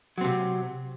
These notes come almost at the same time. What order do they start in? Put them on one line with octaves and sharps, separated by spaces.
F#3 C4 C3